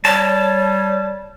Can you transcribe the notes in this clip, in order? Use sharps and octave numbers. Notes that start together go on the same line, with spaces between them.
G3 C#5 A5